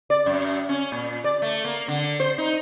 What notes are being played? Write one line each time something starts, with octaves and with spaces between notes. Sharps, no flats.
D5
F#2
C#4
A#2
D5
A3
A#3
D3
C5
D#4